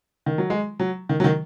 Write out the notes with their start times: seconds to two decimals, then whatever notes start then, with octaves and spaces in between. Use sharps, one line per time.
0.26 D#3
0.38 F#3
0.50 G#3
0.80 F#3
1.09 D#3
1.20 F#3
1.24 D#3